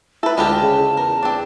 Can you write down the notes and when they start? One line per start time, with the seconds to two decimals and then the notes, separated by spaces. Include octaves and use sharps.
0.23 E4 A4 B4
0.38 D2 G#3 F4 G4 A5
0.62 C#3
0.97 E2 A#4
1.23 C4 D4